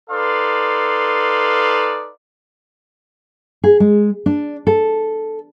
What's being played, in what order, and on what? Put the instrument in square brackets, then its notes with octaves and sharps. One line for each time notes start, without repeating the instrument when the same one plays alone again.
[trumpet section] D#4 A4 B4 D5 F5 C6
[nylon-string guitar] G#4
G#3
D4
A4